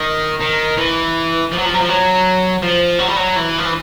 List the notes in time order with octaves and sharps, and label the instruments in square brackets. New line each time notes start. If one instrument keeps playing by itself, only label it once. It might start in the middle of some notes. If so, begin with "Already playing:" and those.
Already playing: [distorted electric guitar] D#3
D#3
E3
F3
F#3
F3
F#3
F3
F#3
F3
F#3
G3
F#3
E3
F3
E3